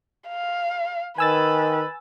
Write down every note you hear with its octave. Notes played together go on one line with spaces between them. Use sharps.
F5
D#3 B4 G#5 E6 A6